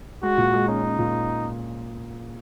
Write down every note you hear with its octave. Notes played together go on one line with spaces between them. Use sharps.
G#3 F#4
A#2
G#3
C#4 D#4
C#4
A#2